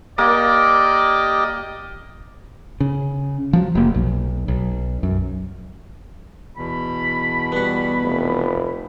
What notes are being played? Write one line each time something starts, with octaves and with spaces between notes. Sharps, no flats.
A#3 G4 D5 D#5
C#3
F3 F#3
F1 A#3
B1
B1
F#2
E2 B2 B5
G3 B3 F#4
F1